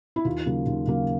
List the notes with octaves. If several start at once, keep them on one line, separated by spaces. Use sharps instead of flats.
E4
D#2 F4
C#3 F#3 A#3
D#2
C#3 F#3 A#3